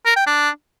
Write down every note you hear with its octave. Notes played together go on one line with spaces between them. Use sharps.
A#4
G5
D4